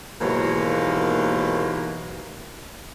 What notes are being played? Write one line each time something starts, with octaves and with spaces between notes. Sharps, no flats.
D#2 G#2 B2 E3 F#3 A#3